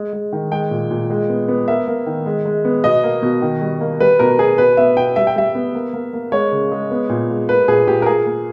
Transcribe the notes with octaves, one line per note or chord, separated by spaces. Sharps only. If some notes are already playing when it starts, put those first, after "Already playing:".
Already playing: G#3
G#3
D#3
G#3 G5
A#2
A#2
G#3
B3
B3
A#3 E5
A#3
D#3
G#3
G#3
B3
B2 D#5
A#3
B2
D#3
G3
A#3
G3 B4
B2 A#4
B2 G#4
B2 B4
B3 E5
B2 G5
G3 E5
G5
G3 E5
B3
A#3
A#3
A#3
G#3 C#5
C#3
G#3
B3
A#2
G#3
A#3 B4
A#2 G#4
A#2 G4
A#4
A#3 G#4
A#3